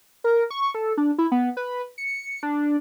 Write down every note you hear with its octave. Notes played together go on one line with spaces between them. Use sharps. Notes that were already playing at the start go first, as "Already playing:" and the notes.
A#4
C#6
A4
D4
E4
B3
B4
C#7
D4